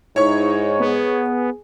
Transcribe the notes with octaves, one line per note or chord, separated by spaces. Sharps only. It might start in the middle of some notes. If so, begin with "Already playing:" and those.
G#2 D#4 E4 C#5 C#6
B3 G#4